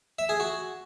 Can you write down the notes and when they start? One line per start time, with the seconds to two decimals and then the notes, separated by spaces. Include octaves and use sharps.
0.19 E5
0.29 G#4
0.40 F#4